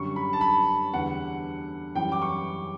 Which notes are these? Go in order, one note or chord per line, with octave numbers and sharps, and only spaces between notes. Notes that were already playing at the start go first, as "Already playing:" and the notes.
Already playing: F#2 D3 G3 C#6
B5
A5
B5
E2 D3 G3 F#5
F#2 E3 G3 G5
D6
C#6